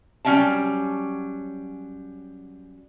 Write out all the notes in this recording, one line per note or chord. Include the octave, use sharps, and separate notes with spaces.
F#3 G3 C#4 E5 G5 A5